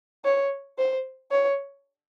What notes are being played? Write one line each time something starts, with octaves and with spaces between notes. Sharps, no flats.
C#5
C5
C#5